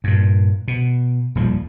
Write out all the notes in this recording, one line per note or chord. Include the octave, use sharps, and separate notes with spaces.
G2 A#2
B2
D#1 D#2 F3 G3